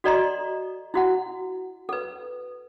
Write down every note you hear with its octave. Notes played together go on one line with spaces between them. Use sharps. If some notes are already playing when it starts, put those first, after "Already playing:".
F#4 A4 D5 D#5 A#5 C6
E4 F#4 F#5
A4 B4